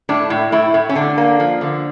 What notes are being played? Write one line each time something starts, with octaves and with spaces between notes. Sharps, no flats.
A2 D4
A2
A2 E4
A2
C#4
D3 D4
A#3
F3
D3